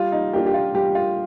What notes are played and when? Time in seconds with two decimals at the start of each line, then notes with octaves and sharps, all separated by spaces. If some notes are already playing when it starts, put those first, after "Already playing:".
Already playing: G3 F4
0.12 D#4
0.33 A#3 D4 F4 G4
0.46 G4
0.54 F4
0.75 G3 G4
0.95 F4